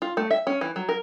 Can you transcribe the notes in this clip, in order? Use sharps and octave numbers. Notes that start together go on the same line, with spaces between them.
F4
A3
E5
C#4
E3
F#3
A#4